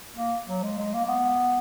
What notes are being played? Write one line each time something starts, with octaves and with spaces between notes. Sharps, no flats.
A#3
F#3
G#3
G#3
A#3
A#3
B3